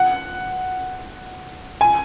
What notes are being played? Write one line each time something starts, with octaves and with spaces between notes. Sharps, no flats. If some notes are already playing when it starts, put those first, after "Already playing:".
Already playing: F#5
G#5